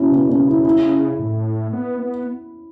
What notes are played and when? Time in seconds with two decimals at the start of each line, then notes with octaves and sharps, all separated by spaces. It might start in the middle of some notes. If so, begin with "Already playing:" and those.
Already playing: C#4 E4 F#4
0.11 C#3 B3
0.29 C#4
0.47 E4
0.65 E4
1.19 A2
1.73 B3
2.00 B3